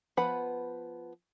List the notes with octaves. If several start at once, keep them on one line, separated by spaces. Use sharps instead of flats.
F3 B3 B4 F#5 B5